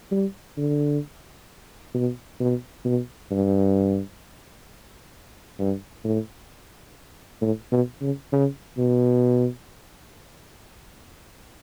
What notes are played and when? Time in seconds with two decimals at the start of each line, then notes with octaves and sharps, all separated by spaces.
0.11 G3
0.57 D3
1.94 B2
2.40 B2
2.85 B2
3.31 G2
5.59 G2
6.04 A2
7.42 A2
7.72 B2
8.02 C#3
8.32 C#3
8.78 B2